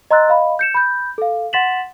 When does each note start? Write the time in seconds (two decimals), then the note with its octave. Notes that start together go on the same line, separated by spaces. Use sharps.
0.11 D#5 A#5 C6 E6 F#6 A6
0.28 D#5 F5 B5
0.59 G6 C#7 E7
0.75 B5 G6
1.18 A4 F5
1.53 F#5 C6 A6 B6 E7 F#7